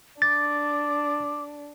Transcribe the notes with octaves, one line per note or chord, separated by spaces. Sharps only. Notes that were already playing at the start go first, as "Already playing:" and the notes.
D4 D6 A6